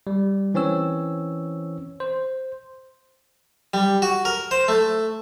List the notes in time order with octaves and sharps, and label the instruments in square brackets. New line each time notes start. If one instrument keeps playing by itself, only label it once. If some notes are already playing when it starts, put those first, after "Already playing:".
[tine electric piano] G3
E3 C4 C#4 C#5 E6
C5
[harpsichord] G3
F#4
A#4
C5
A3